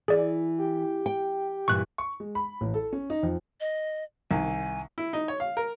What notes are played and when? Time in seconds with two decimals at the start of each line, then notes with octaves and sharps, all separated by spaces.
0.08 E3 G#4 D5
0.58 G4
1.06 G5
1.68 G2 A#2 E3 C#6 F#6
1.98 C#6
2.20 G#3
2.35 B5
2.61 A1
2.74 A4
2.93 C#4
3.10 D#4
3.23 F2
3.60 D#5
4.31 C2 D#3 G#5
4.98 E4
5.13 D#4
5.28 C#5
5.40 F5
5.57 A#4